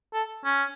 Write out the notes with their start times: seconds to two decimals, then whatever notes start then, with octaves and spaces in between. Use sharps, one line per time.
0.13 A4
0.45 C#4